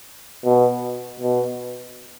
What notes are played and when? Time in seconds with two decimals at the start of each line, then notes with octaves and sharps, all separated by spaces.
0.45 B2
1.20 B2